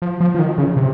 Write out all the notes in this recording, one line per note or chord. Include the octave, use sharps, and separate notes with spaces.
F3
F3
F3
D#3
C#3
C3